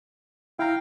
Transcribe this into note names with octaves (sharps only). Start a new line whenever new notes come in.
E4 F5 G5 A#5